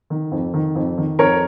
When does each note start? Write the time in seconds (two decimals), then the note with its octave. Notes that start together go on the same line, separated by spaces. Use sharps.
0.10 D#3
0.32 F2
0.54 D#3
0.75 F2
0.98 D#3
1.19 F2 A#4 C#5